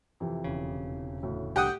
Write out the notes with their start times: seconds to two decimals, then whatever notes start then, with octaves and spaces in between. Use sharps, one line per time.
0.20 F2 C3 E3
0.44 E1 C#3
1.23 D2 A2
1.56 C2 D3 G4 F#5 D#6